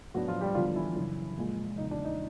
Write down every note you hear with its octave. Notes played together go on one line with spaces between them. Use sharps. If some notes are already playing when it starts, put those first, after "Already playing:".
A2 F#3 B3 D4 F#4
F3 F4
G3 G4
D3 F3 F#3 B3 D4 F4
E3 E4
F#2 C#3 E3
A#2 F3 G#3
E2 C#3 F3 D#4
D4
D#4